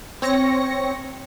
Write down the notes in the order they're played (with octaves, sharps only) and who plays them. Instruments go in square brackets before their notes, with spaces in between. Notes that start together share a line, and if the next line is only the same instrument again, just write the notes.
[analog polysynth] C4 C#5 A#6 C#7